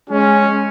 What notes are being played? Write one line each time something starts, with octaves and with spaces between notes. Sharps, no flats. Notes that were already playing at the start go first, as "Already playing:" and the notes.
G#3 C#4